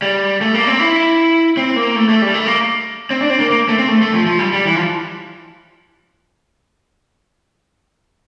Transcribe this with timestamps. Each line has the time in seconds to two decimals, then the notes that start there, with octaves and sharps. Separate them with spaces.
0.02 G3
0.41 A3
0.54 A#3
0.67 C4
0.80 E4
1.57 C4
1.76 A#3
1.95 A3
2.09 A3
2.22 G3
2.34 A3
2.46 A#3
3.10 C4
3.21 D4
3.30 C4
3.40 A#3
3.50 A#3
3.68 A3
3.78 C4
3.89 A3
4.02 A3
4.13 F3
4.26 F3
4.39 G3
4.53 G3
4.66 E3
4.75 F3